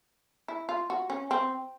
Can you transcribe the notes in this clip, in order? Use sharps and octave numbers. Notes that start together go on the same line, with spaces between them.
E4
F4
F#4
C#4
C4